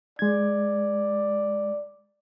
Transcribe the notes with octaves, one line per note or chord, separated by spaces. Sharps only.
G#3 D5 G#6